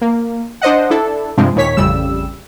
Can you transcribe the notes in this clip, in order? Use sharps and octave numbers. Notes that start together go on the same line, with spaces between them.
A#3
D4 C5 D#5 F#5
D4 E4 A4
G2 C3 F3 G#3 C4 D4
D#2 A#2 C#5 B6
A1 F2 C#3 G3 E6